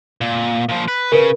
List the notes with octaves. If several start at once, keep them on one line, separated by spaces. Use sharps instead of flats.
A#2
A#2 F3
B4
C#3 A#4 B4